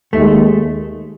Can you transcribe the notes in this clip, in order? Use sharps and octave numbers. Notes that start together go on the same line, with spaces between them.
D#2 D#3 G#3 A3